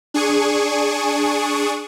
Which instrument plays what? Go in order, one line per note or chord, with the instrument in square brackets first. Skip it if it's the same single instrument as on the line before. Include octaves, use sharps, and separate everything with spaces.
[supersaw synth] D4 G#4 C#6 D#7